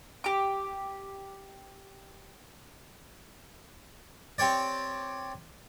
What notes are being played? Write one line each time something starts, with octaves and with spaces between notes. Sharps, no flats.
G4 D6
C4 G4 C#5 D5